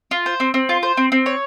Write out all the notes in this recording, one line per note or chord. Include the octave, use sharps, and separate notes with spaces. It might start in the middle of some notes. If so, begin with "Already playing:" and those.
F4
C5
C4
C4
F4
C5
C4
C4
C#5